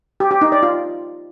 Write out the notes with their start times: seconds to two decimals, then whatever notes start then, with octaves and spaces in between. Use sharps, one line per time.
0.20 G4
0.31 G4
0.41 D#4
0.52 D5
0.63 F4